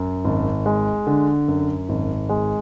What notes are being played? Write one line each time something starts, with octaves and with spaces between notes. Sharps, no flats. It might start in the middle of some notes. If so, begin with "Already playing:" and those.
Already playing: F#2
G#1
G#3
D3
F#2
G#1
G#3